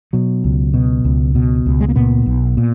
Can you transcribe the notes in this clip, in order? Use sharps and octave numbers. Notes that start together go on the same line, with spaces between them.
B2 F#3
C#2
B2
C#2
B2
C#2
G#3
A#3
A#2 B3
B1
A#2